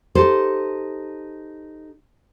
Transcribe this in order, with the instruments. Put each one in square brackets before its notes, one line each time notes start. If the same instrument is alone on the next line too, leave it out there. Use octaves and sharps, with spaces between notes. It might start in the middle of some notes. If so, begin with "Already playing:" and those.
[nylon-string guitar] D#4 G4 A4 C5